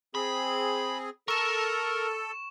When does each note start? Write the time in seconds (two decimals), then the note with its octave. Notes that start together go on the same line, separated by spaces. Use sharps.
0.15 C4 G#4 B5
1.28 A4 A#4 C#6 E7